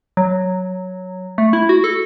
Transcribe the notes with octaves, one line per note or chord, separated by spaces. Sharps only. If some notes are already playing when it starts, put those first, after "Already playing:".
F#3
A3
E4
F#4
A4